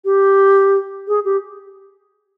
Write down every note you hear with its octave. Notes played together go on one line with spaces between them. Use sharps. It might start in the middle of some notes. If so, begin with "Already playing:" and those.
G4
G#4
G4